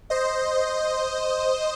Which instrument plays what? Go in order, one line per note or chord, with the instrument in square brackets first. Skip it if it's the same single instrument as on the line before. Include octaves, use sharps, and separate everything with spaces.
[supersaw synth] C5 D#5